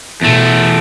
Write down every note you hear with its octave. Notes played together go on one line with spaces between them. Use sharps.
E2 B2 A3